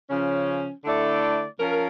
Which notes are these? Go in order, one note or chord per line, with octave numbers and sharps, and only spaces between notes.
C#3 F3 C#4
D3 A3 E4 A4 D5
F3 C#4 F4 A#4